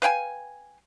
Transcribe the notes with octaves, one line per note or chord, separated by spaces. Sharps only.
B4 F5 G5 G#5